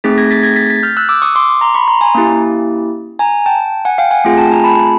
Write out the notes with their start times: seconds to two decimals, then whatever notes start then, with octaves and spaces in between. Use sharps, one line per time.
0.04 A3 C4 D#4 G#4 A6 B6
0.18 G#6 A#6
0.31 A6 B6
0.43 G#6 A#6
0.56 A6 B6
0.70 A6 B6
0.83 F6 G6
0.97 E6 F#6
1.09 D6 E6
1.22 C#6 D#6
1.36 C6 D6
1.61 A#5 C6
1.74 B5 C#6
1.88 A#5 C6
2.01 G#5 A#5
2.15 A#3 C#4 E4 G4
3.19 G#5 A#5
3.46 G5 A5
3.85 F#5 G#5
3.98 F5 G5
4.11 F#5 G#5
4.25 A3 C4 F4 G#4
4.38 G5 A5
4.51 G#5 A#5
4.64 A5 B5